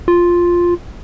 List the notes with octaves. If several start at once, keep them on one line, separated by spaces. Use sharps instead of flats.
F4